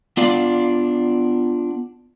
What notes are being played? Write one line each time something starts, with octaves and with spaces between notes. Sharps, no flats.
B3 D4 F4 D5 F5